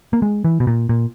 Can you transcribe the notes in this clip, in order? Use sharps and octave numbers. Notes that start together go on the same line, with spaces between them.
A#3
G#3
E3
B2
A#2
A#2